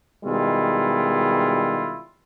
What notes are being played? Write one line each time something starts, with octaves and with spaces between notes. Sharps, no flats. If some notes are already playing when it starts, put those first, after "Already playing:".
B2 D#3 G3 G#3 E4 F4